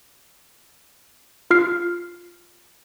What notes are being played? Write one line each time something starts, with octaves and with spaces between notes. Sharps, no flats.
F4 F6 C7